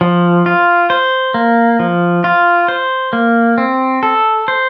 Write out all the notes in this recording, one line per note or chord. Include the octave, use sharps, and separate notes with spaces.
F3
F4
C5
A#3
F3
F4
C5
A#3
C4
A4
C5